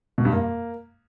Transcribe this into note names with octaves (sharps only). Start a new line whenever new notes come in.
B2
G2
A#3